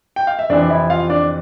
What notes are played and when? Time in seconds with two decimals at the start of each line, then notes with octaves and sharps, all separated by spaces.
0.16 G5
0.27 F5
0.39 E5
0.50 F2 C3 E3 D4 D5
0.62 D5
0.70 E4 E5
0.90 F4 F5
1.10 D4 D5